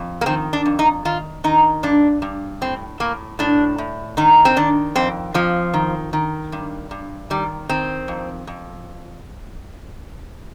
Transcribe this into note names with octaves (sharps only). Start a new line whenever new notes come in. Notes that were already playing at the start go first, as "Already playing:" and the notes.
Already playing: F2
A#3
D#3 C4
D4
F2
D#4
D#3 F4
D#3 D#4
G2 D4
G2
A2 C4
A2 A#3
A2 D4
A2
D#3 D#4
C4
D#3 D4
F2 C4
F2 F3
D#3
D#3
G2
G2
D#3 G3
D#3 C4
F2
F2